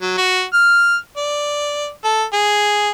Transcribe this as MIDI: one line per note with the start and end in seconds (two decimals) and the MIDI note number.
0.01 0.16 54
0.18 0.43 66
0.54 0.95 89
1.17 1.90 74
2.05 2.24 69
2.33 2.90 68